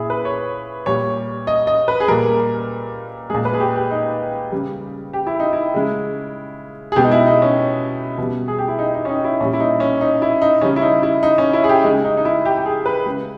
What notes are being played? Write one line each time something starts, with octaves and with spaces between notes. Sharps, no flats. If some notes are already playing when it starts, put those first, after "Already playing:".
Already playing: A#2 E4 G#4
B4
C#5
A#2 G3 C#5
D#5
D#5
B4
G#4
A#2 G3 A#4
A#2 G#3 G#4
B4
G#4
G4
G4
D#4
C#3 G3
G4
E4
D#4
E4
C#3 G#3
G#4
B2 G#3 G4
D#4
E4
D#4
C#4
B2 G3
G#4
G4
E4
D#4
D#4
C#4
D#4
E4
A#2 G3 C#4
E4
D#4
C#4
D#4
E4
D#4
C#3 G3 C#4
E4
D#4
E4
D#4
C#4
E4
G#4
G4
C#3 G#3 D#4
D#4
D#4
E4
G4
G4
G#4
B4
C#3 G#3